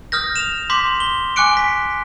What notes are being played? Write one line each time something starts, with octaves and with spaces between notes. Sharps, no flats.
D#6 F6 G6 A#6
E7 F7
C6 D6 G6 B6
G7
G#5 C#6 D6 F#6 C#7 D7
B6